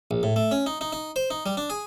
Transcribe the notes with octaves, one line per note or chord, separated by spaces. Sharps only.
A#1
A2
A3
C#4
D#4
D#4
D#4
C5
D#4
G3
D4
G#4